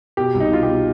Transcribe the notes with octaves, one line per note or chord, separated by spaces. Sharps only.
B2 G4
C2
D#4
B2 F4
G4
B2